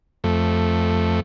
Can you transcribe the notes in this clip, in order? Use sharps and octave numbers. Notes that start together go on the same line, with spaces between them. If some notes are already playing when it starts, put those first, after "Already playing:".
F2 A3